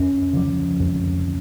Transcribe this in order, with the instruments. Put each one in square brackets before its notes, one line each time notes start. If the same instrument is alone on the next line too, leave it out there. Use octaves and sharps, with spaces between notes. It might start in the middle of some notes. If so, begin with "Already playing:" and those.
Already playing: [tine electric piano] F2 C#4
C#3 F3
F2